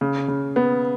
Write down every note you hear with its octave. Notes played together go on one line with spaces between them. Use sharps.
C#3
C#3
B3